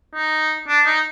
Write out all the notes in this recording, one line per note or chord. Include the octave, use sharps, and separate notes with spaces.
D#4
D4
D#4